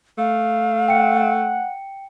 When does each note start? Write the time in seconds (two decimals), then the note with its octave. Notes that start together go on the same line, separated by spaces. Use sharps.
0.18 A3 F5
0.88 F#5 G5 C#7